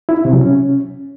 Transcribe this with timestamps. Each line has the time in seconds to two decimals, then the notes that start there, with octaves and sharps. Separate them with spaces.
0.09 E4
0.17 D#4
0.25 C3
0.33 F#3
0.41 C#4